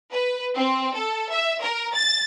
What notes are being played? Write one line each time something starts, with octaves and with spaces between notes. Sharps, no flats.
B4
C4
A4
E5
A#4
A6